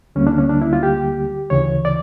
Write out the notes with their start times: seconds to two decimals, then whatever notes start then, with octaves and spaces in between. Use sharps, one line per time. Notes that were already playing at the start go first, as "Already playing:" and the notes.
0.15 D2 D3 G3 A#3 C#4
0.27 D4
0.38 C#4
0.50 D4
0.62 E4
0.73 F4
0.83 G4
1.50 D2 C#3 E3 C#5
1.85 D5